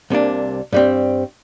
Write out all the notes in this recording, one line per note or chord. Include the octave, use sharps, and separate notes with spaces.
C2 C3 A#3 D4
G2 G3 C4